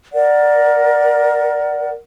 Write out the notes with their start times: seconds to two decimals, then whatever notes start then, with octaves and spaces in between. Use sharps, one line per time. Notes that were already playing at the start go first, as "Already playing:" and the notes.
0.13 A#4 D5 F#5